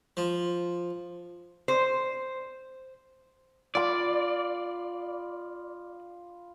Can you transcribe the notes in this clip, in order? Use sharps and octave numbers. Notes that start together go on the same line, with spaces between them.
F3
C5
F4 D5 B5